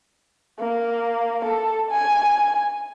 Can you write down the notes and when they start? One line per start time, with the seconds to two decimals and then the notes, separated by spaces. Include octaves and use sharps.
0.59 A#3
1.44 A4
1.90 G#5